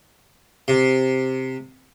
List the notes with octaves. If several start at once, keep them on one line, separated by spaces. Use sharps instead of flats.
C3